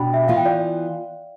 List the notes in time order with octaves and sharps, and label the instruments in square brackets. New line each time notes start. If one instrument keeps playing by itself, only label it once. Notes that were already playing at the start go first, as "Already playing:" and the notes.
Already playing: [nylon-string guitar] B2 D4 G4 [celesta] G5 B5
[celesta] E5 G5
[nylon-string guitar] E3 B3 F4 [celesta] F5
[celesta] G5
D5 F5